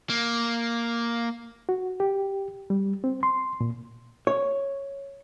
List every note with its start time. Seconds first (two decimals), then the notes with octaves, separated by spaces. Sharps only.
0.10 A#3
1.69 F#4
2.00 G4
2.70 G3
3.04 C4
3.23 C6
3.61 A#2
4.27 C#5